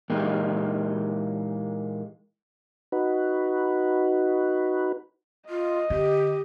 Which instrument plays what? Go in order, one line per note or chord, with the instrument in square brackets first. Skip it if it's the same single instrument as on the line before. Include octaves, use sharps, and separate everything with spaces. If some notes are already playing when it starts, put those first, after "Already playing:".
[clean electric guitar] A#2 E3 G#3 A#3 D#4 G4
[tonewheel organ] D#4 F#4 B4
[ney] F4 [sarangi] D#5
[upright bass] D3 [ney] G4